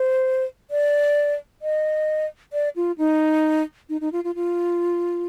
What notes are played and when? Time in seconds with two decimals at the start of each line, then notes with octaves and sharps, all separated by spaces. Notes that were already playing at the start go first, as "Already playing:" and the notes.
Already playing: C5
0.71 D5
1.62 D#5
2.53 D5
2.76 F4
2.98 D#4
3.89 D#4
4.01 D#4
4.12 F4
4.24 F4
4.35 F4